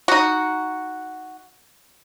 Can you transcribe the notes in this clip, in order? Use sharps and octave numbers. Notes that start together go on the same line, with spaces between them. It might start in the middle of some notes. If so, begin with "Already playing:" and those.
D#4 F#4